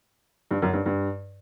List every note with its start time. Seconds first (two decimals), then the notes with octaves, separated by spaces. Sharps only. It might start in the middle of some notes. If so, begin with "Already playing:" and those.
0.51 G2
0.62 F#2
0.73 G2
0.86 G2